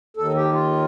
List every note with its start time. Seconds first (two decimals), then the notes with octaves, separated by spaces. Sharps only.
0.17 D#2 D#3 A4
0.35 G4
0.52 F4